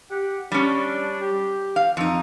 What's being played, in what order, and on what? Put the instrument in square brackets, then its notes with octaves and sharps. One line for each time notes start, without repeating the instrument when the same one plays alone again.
[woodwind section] G4 F#5
[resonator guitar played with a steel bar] G3 C#4 [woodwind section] D4
[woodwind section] G4
[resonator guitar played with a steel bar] F5
F2 D#4